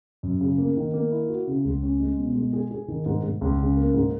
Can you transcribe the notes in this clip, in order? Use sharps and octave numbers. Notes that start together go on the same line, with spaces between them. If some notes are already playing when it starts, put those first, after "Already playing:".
F#2
C#3
A#3
D#3
A#3
E4
F#4
C#3
C#2
C#4
G#3
B2
G#3
G#4
G#4
D#3
G#2
G#2
C#2
C#3
A#3
G#2